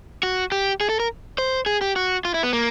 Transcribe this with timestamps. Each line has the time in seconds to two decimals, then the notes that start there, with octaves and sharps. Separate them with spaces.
0.23 F#4
0.52 G4
0.81 G#4
0.89 A4
1.00 A#4
1.38 C5
1.66 G#4
1.81 G4
1.96 F#4
2.25 F4
2.34 E4
2.43 B3
2.53 A#3